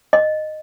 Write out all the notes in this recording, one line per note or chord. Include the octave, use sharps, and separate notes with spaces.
D#5